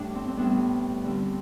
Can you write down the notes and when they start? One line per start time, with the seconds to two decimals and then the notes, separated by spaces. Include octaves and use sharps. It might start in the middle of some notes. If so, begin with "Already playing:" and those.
Already playing: A2 G3 D4
0.15 C4
0.28 C4
0.37 A2 G3 B3 D4
1.04 D3 G3 C4